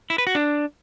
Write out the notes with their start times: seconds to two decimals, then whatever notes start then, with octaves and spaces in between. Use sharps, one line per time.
0.10 E4
0.18 B4
0.27 F#4
0.35 D4